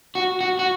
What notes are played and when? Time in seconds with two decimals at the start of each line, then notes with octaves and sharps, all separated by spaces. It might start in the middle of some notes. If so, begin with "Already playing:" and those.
0.15 F#4
0.41 F#4
0.59 F#4